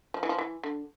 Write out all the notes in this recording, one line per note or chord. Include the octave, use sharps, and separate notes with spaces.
F3
E3
F3
E3
D3